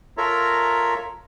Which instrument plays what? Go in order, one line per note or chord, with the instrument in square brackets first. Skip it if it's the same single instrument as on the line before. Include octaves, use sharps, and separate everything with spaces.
[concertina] F4 A4 A#4 C#5 E5 A#5